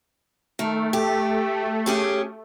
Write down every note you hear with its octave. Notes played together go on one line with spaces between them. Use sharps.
D#3 A3
G4
C#4 G4 G#4